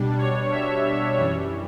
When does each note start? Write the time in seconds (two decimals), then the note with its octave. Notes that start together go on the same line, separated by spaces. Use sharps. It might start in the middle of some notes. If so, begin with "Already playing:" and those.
Already playing: B2 G3 D4
0.18 C#5
0.52 E5
1.17 F#2 E3 G3 C#5